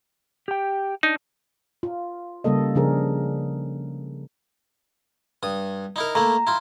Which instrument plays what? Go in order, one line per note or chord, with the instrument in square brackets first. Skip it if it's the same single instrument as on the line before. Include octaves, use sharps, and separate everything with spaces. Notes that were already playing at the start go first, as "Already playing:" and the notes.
[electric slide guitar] G4 G5
[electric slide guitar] D4 [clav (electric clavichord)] D#4
[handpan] F4
C#3 G3 A#3 A4 D#5
C#3 F3 D4 G#4 A#4
[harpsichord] G2 D#6
D#4 E4 A#4
[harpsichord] A3 A#3 E4 [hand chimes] A#5
[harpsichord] E4 F4